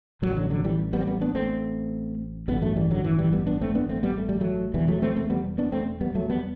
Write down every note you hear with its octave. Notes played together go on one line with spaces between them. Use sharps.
A1 A2 D3 F#3
G3
D3 F#3
D3 F#3
E3 G3
G3 B3
C4
G3 B3
B3 D4
A3 C4
A1 G2 D3 G3 B3
F#3 A3
E3 G3
D3 F#3
E3
E3 G3
G3 B3
B3 D4
A3 C4
B3 D4
A3 C4
G3 B3
A3
G3
F#3 A3
E1 E2 C3 E3 G3
F#3 A3
A3 C4
A3 C4
G3 B3
B3 D4
A3 C4
G3 B3
F#3 A3
G3 B3